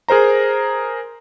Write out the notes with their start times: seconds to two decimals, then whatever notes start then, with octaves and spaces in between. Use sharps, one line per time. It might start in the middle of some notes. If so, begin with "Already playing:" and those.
0.09 G#4 A#4 C5 A#5